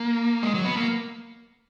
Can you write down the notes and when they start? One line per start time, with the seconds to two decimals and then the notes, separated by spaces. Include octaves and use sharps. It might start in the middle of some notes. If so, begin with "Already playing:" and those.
Already playing: A#3
0.43 G#3
0.54 F#3
0.65 B3
0.77 A#3